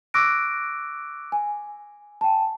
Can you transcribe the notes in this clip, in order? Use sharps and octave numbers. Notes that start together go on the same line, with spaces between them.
C#6 D6 E6 F#6 A#6 D7
G#5
G5 A5